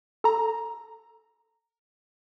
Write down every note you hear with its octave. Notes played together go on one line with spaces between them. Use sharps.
A4 A#5